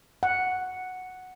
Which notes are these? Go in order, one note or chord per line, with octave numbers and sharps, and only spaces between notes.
F#5